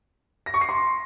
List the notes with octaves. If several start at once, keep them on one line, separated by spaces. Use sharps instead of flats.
A#6
C#6
C7
C6